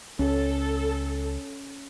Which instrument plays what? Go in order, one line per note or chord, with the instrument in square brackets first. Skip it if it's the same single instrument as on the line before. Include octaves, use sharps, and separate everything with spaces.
[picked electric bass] C#2 [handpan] C#4 [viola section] A4